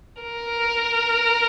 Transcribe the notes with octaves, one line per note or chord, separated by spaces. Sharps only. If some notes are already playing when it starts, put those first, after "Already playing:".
A#4